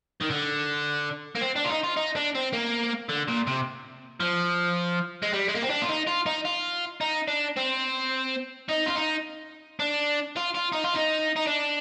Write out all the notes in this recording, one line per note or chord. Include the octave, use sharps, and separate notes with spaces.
D#3
D3
A#3
C4
D4
F4
D#4
F4
D#4
D4
C4
A#3
D3
A#2
C3
F3
G#3
G3
G#3
A#3
C4
D4
F4
D#4
F4
D#4
F4
D#4
D4
C4
D#4
F4
D#4
D4
F4
F4
D#4
F4
D#4
D#4
D4